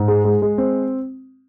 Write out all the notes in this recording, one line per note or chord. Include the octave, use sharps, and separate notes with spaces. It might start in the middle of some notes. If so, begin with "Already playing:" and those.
Already playing: G#2
G#3
G#3
G#3
C4